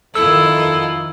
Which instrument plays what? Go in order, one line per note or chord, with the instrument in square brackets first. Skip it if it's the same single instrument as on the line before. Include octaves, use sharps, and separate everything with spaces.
[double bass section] F2 D#3 [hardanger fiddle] E4 F4 [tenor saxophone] A4 [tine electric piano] E6